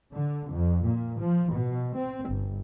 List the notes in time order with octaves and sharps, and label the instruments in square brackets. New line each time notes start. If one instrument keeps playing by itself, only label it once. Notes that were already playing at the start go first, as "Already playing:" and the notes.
[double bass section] D3
F2
A#2
F3
B2
C4
G1